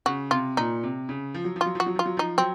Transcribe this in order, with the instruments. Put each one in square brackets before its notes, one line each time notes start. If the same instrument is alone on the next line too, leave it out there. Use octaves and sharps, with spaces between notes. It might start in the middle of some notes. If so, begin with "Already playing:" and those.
[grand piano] C#3 [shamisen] F#4
[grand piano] C3 [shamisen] F4
[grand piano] A#2 [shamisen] D#4
[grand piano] C3
C#3
F3
F#3
[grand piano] F3 [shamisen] F4
[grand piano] F#3
[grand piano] F3 [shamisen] F#4
[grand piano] F#3
[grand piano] F3 [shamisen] F4
[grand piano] F#3
[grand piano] F3 [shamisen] D#4
[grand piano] F#3 [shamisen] C4